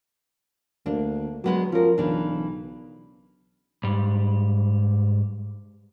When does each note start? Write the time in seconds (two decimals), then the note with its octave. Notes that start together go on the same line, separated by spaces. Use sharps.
0.86 D2 A#3 D4
1.44 F#3 G#3 B3 D4
1.72 F3 C#4 A#4
1.98 B1 C#3 E3 D4
3.84 G#2 G3